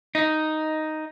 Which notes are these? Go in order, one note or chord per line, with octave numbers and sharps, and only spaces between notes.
D#4